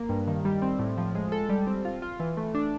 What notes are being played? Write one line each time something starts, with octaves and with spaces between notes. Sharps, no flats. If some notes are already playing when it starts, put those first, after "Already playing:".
Already playing: A#3
G2
D#3
G3
C4
A2
F3
G#3
A4
G3
C4
F4
F4
E3
A3
D4